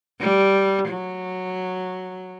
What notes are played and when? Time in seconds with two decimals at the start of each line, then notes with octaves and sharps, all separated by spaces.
0.20 G3
0.88 F#3